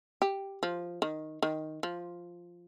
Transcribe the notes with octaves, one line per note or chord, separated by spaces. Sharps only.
G4
F3
D#3
D#3
F3